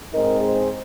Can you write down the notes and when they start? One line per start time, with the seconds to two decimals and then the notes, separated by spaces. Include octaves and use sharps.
0.13 G#2 G#3 C4 D#4 A#4 D#5
0.41 G#4 C5